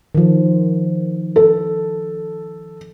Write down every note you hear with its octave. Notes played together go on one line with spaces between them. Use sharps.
D#3 F3
A4